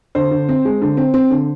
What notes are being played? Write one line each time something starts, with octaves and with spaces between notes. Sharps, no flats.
D3 C5
D3
C4
G#3
D3
C4
C4
D3